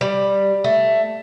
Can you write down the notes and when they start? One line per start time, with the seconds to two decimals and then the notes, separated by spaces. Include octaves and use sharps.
0.01 G3
0.64 A3